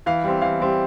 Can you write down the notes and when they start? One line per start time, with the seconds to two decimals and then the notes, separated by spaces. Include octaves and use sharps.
0.06 E3 F5
0.24 G3 C4
0.42 E3 F5
0.60 G3 C4